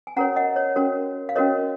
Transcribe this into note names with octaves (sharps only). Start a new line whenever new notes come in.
G#5
C#4 F#4 A#4 C#5 F#5 A#5
D#5 F#5
C#5
C#4 F#4 A#4 C#5
F5
C#4 F#4 A#4 C#5 D#5